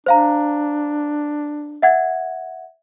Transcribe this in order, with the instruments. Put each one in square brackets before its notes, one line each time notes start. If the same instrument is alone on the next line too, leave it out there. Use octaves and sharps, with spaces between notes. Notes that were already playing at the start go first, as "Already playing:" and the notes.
[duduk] D4 [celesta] C5 F5 A#5
[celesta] E5 F#5 G#6